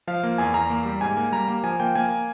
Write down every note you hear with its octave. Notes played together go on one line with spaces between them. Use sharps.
F3 F5
A#3
E2 G#5
E2 A#5
A#3
G3
G#2 G#5
A#3
G3 A#5
A#3
F3 G#5
A#3 G5
A#3 G#5